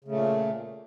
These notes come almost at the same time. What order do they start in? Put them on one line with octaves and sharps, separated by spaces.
C#3 A3 A#2